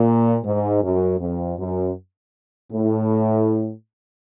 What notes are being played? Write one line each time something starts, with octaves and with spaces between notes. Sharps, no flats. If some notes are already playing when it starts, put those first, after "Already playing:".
Already playing: A#2
G#2
F#2
F2
F#2
A2